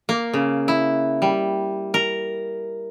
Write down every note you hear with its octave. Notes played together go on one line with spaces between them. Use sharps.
A#3
C#3
E4
G3
A#4